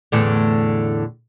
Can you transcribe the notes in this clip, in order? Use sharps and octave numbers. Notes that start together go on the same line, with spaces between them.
E2 A2 D3